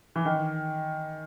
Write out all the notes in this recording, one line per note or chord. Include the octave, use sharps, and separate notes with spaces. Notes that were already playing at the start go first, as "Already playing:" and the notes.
E3
D#3